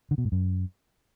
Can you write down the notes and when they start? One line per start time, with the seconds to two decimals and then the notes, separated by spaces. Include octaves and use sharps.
0.11 D3
0.18 B2
0.25 G#2
0.32 F#2